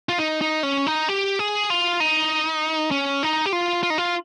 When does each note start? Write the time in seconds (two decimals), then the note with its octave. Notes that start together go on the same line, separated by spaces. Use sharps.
0.09 F4
0.18 D#4
0.41 D#4
0.63 C#4
0.87 D#4
1.09 G4
1.39 G#4
1.70 F4
2.00 D#4
2.91 C#4
3.23 D#4
3.46 G4
3.53 F4
3.83 F4
3.90 D#4
3.98 F4